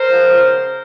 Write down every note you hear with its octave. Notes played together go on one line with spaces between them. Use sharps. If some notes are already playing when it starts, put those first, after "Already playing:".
Already playing: A#4 C5
F3 G#3 B3
C#3